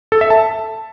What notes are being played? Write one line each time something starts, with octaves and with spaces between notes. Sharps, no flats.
A4
E5
A5